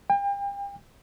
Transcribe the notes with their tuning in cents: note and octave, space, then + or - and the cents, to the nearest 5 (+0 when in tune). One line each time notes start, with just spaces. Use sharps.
G5 +35